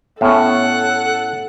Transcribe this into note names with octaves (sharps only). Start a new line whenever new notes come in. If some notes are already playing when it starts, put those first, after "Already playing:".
A2 B3 C#4 A4 E5 F#5